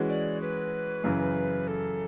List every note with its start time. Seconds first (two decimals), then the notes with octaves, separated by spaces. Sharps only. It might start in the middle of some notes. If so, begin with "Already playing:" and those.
Already playing: E3 G#3 C#4 F#4
0.09 D5
0.41 B4
1.04 F#2 C#3 E3
1.68 A4